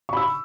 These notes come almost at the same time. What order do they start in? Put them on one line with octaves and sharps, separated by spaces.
C#6 B5 E6